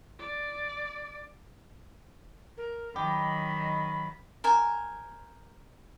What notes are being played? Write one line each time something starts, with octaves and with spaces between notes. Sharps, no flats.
D5
A#4
D#3 F#3 G4 D#5 B5
A#4 C5 G#5